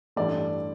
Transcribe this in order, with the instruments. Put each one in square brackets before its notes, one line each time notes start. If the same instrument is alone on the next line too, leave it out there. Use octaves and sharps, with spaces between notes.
[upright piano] A1 G2 E3 A3 D5